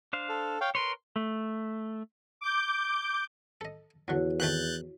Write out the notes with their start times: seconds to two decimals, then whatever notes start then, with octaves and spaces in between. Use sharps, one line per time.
0.13 D4 C5 F5
0.29 A4
0.61 C#5 F5 G5
0.75 A#4 B4 C#5 C6
1.16 A3
2.41 D6 G6
3.61 A4 D#5
4.08 E2 D3 F#3 E4 F#4 C#5
4.40 F2 D#3 A3 F#6 G6 A6